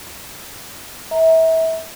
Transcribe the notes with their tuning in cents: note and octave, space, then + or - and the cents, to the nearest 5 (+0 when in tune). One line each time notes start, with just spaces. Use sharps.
E5 -30 A#5 +0